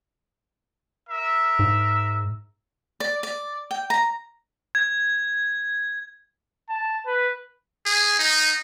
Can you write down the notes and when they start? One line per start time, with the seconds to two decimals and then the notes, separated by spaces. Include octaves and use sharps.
1.10 A#4 E5
1.59 G#2
3.00 D5
3.23 D5
3.71 G5
3.90 A#5
4.75 G#6
6.69 A5
7.06 B4
7.86 G#4
8.19 D#4